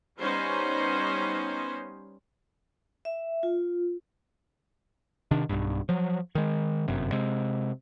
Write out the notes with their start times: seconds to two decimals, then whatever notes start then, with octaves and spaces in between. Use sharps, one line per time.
0.19 G3 B3 C#4 D#4 C5
3.05 E5
3.43 F4
5.31 C3 D#3 D4
5.49 B1 G2
5.89 F3 F#3
6.35 D#3 G#3
6.88 G1 F#2 C3
7.12 C3 G#3